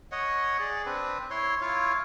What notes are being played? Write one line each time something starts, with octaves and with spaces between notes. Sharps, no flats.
C#5 D#5 F#5
G#4 D5
C4 D4 B4
E4 C#5 C6
E4 F4 C#5 F5